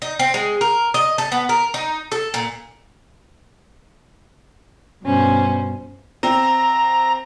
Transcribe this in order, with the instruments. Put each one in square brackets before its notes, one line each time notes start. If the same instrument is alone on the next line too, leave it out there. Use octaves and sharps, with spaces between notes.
[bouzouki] D#4
C4
G#3
A#4
D#5
A4
B3
A#4
D#4
A4
A#2
[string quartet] G2 B2 C#4 C5
[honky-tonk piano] C4 [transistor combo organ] A#5